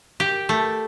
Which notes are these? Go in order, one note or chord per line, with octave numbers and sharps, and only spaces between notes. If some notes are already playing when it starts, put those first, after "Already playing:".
G4
A3